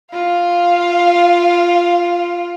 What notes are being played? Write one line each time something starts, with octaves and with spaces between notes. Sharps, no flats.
F4 F5